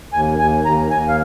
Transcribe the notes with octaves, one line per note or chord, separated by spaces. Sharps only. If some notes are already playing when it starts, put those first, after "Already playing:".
D#2 G#5
D#2 G#5
D#2 A#5
D#2 G#5
F5